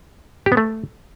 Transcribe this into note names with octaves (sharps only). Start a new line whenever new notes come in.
G4
B3
A3